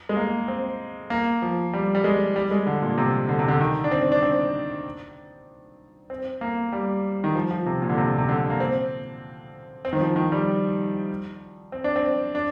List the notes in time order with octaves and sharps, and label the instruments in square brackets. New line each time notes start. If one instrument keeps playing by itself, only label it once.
[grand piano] G#3
A#3
C4
A#3
F3
G3
G3
G#3
G3
G#3
D3
A#2
C3
D3
C3
D3
D#3
D4
C4
D4
C4
C4
A#3
G3
D#3
F3
F3
C3
A#2
D3
C3
C3
D3
A#3
C4
C4
D#3
F3
D#3
G3
C4
D4
C4
D4